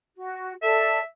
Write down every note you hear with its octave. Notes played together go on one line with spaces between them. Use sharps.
F#4
A4 D5 E5